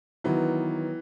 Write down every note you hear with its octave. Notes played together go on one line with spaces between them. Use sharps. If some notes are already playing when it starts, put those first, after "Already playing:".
D#3 E3 F#3 B3